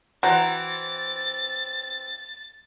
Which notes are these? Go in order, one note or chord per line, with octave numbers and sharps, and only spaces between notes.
E3 C4 F#4 C5 A#5 A6